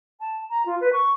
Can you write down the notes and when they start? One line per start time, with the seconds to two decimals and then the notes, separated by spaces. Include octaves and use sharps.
0.20 A5
0.50 A#5
0.65 F4
0.80 B4
0.92 C#6